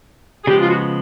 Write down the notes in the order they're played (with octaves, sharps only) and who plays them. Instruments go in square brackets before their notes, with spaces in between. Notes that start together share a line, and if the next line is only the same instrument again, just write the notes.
[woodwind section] G#4
[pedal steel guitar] C#3 F3 G#3 B3 [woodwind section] G4
[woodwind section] F4
F#4